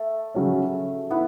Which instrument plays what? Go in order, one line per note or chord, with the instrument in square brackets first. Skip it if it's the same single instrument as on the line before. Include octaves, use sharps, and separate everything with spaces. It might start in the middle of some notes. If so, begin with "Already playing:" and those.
Already playing: [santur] A3
[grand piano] C#3 F#3 C#4
[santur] B3 [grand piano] E4